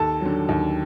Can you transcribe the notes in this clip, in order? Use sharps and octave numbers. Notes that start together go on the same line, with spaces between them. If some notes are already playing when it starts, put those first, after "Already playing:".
Already playing: D#2 A4 A5
D3 F#3
D#2